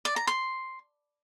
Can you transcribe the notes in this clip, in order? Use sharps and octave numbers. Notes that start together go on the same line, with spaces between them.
D5
A#5
C6